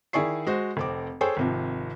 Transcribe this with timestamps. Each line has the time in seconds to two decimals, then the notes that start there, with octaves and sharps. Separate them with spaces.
0.13 D#3 E4 G#4 D5 C#6 C7
0.46 G#3 F#4 C5
0.77 F1 C4 D6
1.21 G#4 A4 C5 C#5 G5 G#5
1.37 G#1 C3 F3